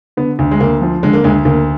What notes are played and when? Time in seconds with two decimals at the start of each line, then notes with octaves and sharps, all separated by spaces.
0.17 D3 B3
0.39 D2
0.51 G#3
0.60 D2 A#3
0.82 F3
1.03 D3 G#3
1.13 A#3
1.24 D2 G#3
1.45 D2 A#3